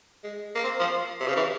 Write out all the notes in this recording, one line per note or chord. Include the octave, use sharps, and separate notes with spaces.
G#3
A#3
C4
F3
C3
C#3
E3